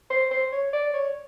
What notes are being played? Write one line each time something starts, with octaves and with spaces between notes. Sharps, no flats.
C5
C5
C#5
D5
C#5